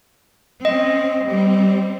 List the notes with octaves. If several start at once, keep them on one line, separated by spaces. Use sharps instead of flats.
C4 C#4 D#5
G3 C4